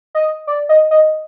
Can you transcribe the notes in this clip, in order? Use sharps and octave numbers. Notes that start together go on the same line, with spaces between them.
D#5
D5
D#5
D#5